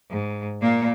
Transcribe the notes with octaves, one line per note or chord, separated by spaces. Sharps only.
G#2
A#2 A#3